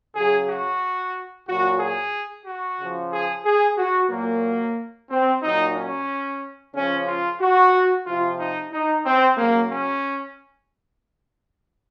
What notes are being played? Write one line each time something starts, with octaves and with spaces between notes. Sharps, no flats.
C#3 F#3 G#4
F#4
A#2 F#3 F#4
G#4
F#4
C#3 F3
G#4
G#4
F#4
A#2 F#3 A#3
C4
A#2 F#3 D#4
C#4
C#3 F3 C#4
F4
F#4
C3 F3 F4
D#4
D#4
C4
C#3 F#3 A#3
C#4